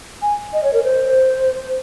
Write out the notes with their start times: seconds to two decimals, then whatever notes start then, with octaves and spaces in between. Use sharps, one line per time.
0.22 G#5
0.53 D#5
0.64 C#5
0.73 A#4
0.84 C5